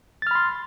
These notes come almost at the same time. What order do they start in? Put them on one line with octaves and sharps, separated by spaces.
A6 F6 B5 C6